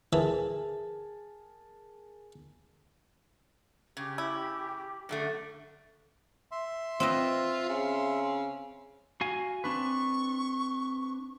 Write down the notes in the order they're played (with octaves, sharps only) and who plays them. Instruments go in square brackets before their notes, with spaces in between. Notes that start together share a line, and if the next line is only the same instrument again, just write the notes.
[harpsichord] E3 [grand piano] G#4 A#4 A5
[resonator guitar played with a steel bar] C#3 [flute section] G4
[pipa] E4
[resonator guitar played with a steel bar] F#2 D3 A3
[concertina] E5 C6
[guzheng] C4 B4 D#5 [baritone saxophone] F4
[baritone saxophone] C#3
[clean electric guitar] F#4 F5 G#5
[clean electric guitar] C4 D4 B4 [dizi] C#6